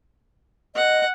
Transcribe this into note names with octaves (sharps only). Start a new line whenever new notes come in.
D#5 F#5